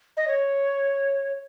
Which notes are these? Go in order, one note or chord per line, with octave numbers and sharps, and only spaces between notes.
D#5
C#5